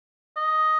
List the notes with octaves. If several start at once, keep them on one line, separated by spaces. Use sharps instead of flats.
D#5